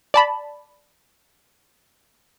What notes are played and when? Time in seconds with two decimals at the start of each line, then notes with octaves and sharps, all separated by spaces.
0.14 D5 A5 B5